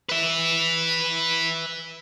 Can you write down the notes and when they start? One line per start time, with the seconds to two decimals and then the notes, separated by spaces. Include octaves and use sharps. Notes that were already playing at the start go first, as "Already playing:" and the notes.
0.09 B4 E5